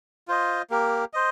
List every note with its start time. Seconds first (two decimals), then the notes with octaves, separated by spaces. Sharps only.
0.28 F4 C5 D#5
0.70 A#3 G4 A#4
1.13 C5 D#5